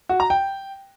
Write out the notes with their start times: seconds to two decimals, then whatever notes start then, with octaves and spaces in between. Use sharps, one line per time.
0.09 F#4
0.20 A#5
0.30 G5